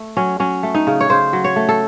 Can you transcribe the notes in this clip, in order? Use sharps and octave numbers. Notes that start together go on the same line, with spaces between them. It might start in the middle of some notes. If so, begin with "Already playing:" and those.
Already playing: A3
F#3 C#4
F#3 C#4
A3
D#4
C#3
C#5
C#3 C5
F#3
C#5
A3
A4